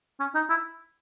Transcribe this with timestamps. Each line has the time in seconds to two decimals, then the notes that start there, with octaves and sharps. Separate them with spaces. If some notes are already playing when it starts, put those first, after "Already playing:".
0.20 C#4
0.35 D#4
0.50 E4